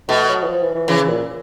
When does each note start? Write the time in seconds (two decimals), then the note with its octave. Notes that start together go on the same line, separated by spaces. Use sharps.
0.08 B2 A3
0.29 F#3
0.43 E3
0.48 F3
0.62 E3
0.75 E3
0.88 C#3 E3
1.08 A#2